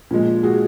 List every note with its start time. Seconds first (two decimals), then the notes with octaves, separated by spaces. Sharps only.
0.11 A#2 F3 G#3
0.43 F#4 G#4